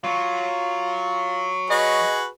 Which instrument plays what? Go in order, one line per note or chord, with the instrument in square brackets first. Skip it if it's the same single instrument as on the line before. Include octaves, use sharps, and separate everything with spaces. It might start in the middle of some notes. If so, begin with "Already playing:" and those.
[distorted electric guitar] F#3 [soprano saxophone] F4
[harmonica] F#4 G#4 B4 [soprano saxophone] D#5